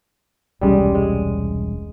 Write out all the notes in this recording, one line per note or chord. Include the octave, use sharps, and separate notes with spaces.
E1 C2 G3 G#3 C#4
G#3